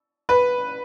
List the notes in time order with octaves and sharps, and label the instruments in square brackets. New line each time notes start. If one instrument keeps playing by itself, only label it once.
[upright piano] B4